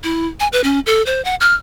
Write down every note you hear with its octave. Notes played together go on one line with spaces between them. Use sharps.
E4
G#5
B4
C#4
A4
C5
F#5
F6